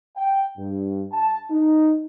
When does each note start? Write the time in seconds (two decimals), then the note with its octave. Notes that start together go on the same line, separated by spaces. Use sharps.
0.16 G5
0.58 G2
1.12 A5
1.51 D#4